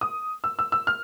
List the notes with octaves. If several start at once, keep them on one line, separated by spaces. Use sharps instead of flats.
D#6
E6
E6
E6
F6